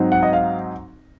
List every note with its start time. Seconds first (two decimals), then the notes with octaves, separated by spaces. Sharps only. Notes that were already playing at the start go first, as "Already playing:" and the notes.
Already playing: G#2 F#3 C4 D#4
0.12 F#5
0.23 D#5
0.33 F5